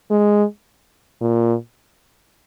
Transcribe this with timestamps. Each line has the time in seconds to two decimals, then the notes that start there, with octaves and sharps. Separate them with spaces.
0.11 G#3
1.21 A#2